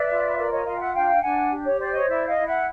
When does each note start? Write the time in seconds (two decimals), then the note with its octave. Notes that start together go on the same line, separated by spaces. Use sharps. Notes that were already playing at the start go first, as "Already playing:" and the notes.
Already playing: B4 D5 E5
0.09 F4
0.36 A#4 D5
0.51 C#5 D#5
0.65 F4 D#5 F5
0.75 G5
0.79 E5 F#5
0.94 D4 F5 G5
1.22 D4 F#5 G#5
1.50 G4
1.65 C#5
1.79 C5 D5
1.93 C#5 D#5
2.08 E4 D5 E5
2.26 D#5 F5
2.36 E4
2.45 E5 F#5